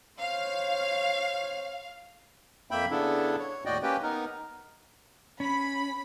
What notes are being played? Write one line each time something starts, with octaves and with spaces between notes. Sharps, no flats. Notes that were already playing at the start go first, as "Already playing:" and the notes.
C5 C#5 F5
F2 A#3 E5 G5 B5
C#3 B3 D4 E4 A4
C#5
D#2 A2 F#4 D5 D#5 G5
A#3 C#4 G4 B4 G5
B3 D#4 A#4
C#4 B5